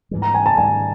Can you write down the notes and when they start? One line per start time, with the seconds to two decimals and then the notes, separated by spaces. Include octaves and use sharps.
0.11 G#2 E3 G3
0.22 A#5
0.34 G#5
0.46 A5
0.57 G#2 D#3 G3 G#5